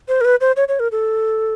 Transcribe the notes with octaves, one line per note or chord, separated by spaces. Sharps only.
C5
A#4
B4
C5
C#5
C#5
A#4
A4